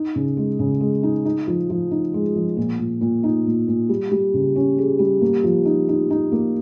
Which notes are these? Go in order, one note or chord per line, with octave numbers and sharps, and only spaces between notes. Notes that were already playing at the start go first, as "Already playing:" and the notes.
Already playing: D#4
C#3
G#3
C#3
G#3
D#4
D#4
F3
F3
D#4
G#3
F3
A#2
A#2
A#2
D#4
A#2
A#2
G3
G3
C#3
C#4
G#4
G3
A#3
F3
D#4
D#4
D#4
A#3